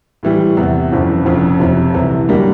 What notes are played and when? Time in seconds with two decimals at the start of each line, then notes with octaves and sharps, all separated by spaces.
0.23 A2 E3 G3
0.57 E2 C3 E3
0.92 G1 F2 C#3 E3
1.25 F1 F2 C#3
1.60 F#1 F2 C3
1.94 C2 C3 E3
2.28 F#2 D3 G3 A#3 D4